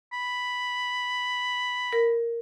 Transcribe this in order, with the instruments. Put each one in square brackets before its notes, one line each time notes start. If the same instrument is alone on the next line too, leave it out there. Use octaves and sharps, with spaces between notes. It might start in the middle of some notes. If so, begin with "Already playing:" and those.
[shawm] B5
[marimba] A#4